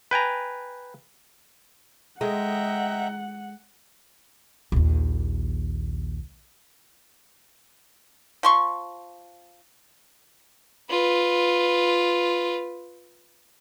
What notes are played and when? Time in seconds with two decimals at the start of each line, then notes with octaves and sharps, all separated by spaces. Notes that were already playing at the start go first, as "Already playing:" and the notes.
0.11 B4 G5 G#5 A#5
2.21 G#3 D#5 E5 F#5 G5 A#5
4.72 A#1 D#2
8.43 F3 C6 C#6
10.90 F4 B4